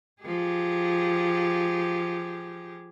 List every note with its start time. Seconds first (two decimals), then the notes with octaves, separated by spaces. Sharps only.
0.22 F3 G4 G#4